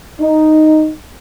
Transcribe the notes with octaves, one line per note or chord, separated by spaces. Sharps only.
D#4